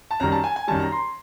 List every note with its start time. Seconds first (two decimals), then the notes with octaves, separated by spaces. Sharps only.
0.11 A5
0.20 F#2 D#3 G3 A#5
0.32 A5
0.44 G#5
0.56 G#5
0.68 F#2 D#3 G3 A5
0.80 A#5
0.92 C6